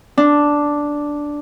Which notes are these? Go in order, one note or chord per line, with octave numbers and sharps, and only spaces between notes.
D4